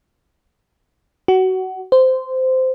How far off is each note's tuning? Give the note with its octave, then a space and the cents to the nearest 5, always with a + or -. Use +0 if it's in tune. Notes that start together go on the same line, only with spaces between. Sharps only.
F#4 +20
C5 -15